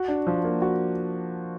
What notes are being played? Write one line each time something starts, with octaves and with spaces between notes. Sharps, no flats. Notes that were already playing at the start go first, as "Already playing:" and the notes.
Already playing: F#4
D4
F3
A#3
F#4